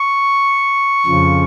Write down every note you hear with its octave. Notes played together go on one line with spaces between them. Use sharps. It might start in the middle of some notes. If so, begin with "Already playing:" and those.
Already playing: C#6
F2 C#3 F3